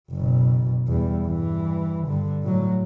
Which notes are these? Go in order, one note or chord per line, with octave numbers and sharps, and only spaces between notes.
F#1 B2
E2 G3
G2 E3
G2 D3
A2 F#3